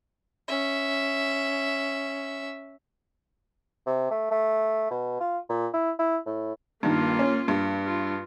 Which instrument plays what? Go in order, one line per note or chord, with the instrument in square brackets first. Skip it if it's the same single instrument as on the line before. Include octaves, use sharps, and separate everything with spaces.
[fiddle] C#4 E5
[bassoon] C3
A3
A3
B2
F4
A#2
E4
E4
A2
[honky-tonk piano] G2 D#3 [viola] A#3 F4
[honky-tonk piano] C#4
G2
[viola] F4